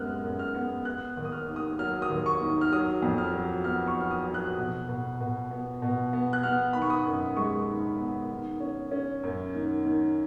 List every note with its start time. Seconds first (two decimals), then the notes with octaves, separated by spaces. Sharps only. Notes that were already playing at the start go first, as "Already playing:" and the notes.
Already playing: F#2 G#3 B3 F6 F#6
0.23 F#2
0.39 F6
0.54 B3
0.85 B3 F#6
1.17 D#2
1.25 D#6
1.32 F6
1.48 D#3
1.56 D#6
1.79 F#3 F6
2.02 D#6
2.10 D#2
2.26 C#6
2.41 D#3
2.61 F6
2.72 F#3 D#6
3.02 F2
3.18 F6
3.34 F#3
3.64 B3 F6
3.88 C#6
3.96 F#3 F6
4.11 D#6
4.27 F#3
4.34 F#6
4.58 B2
4.88 B2
5.20 B2
5.51 B3
5.82 B2
6.13 B3
6.33 F#6
6.43 B3 F6
6.73 D#3 B5
6.82 C#6
6.90 D#6
7.06 F#2
7.37 G#3 C#6
7.68 D#3
7.98 B3
8.30 D#3
8.60 C#4
8.91 C#4
9.23 F#2
9.54 D#3
9.85 D#3